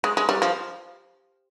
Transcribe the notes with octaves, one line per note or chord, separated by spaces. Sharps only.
G#3
G#3
G3
F3